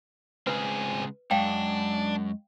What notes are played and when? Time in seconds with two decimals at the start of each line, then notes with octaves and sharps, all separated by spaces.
0.47 C#3 G#3 C4 G#4 B4
1.31 F#2 G#3 D4 F5 G5